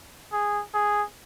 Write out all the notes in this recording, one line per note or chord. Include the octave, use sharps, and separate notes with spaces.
G#4
G#4